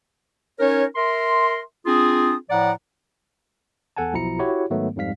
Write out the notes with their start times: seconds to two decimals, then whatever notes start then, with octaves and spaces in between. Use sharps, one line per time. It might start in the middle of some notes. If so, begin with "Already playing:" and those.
0.60 C#4 D#4 A#4 C#5
0.96 A#4 E5 C6
1.86 C4 D4 F4 G#4 D#6
2.50 A2 F3 D5 F#5 A#5
3.97 E2 A4 F#5 G#5 A5
4.13 B1 B2 F3 E4 A#5 C#7
4.39 E4 F#4 G4 C#5
4.70 G#2 D#3 F#3 A3 B3
4.96 F2 G#2 G3 F5 B6